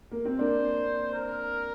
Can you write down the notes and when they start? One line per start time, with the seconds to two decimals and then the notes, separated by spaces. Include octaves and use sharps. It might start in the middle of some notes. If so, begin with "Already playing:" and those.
0.11 A#3
0.25 C4
0.39 A#3 D4 C5
1.13 A#4